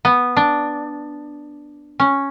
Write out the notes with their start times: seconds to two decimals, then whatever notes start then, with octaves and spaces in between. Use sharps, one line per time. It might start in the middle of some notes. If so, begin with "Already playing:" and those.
0.05 B3
0.37 D4
2.00 C#4